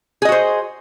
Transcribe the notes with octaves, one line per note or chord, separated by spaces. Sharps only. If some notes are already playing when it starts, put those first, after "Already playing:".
F#4 G#4 C5 D#5